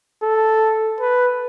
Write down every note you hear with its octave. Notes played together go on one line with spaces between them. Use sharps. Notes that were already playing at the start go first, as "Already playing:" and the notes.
A4
B4